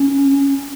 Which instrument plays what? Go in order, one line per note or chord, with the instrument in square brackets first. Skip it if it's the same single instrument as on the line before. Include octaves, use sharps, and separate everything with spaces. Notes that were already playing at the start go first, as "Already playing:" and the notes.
Already playing: [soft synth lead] C#4